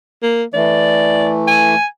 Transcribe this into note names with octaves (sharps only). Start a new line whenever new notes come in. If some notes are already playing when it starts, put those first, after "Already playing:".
A#3
E3 A3 D5
G#5